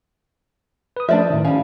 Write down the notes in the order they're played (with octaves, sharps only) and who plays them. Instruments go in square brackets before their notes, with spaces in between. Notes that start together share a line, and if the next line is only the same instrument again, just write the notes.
[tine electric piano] B4 D#6
[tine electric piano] F3 A3 [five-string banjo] D4 D5 E5
[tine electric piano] A2 D#3
[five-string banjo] G3 C#4 [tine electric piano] F5